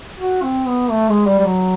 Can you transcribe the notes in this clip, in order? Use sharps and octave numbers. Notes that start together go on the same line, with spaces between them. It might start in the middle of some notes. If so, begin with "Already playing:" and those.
F#4
C4
B3
A3
G#3
G3
G3
F#3